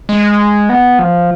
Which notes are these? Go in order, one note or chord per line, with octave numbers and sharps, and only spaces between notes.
G#3
B3
F3